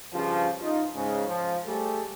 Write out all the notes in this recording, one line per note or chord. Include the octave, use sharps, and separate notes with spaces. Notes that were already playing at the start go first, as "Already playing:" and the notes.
G2 C#3 F3
D#4 F4
G#2 C#3
F3
G3 A3 G#4 A4